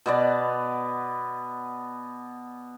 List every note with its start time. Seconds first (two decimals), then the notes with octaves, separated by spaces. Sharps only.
0.06 B2 B3 D5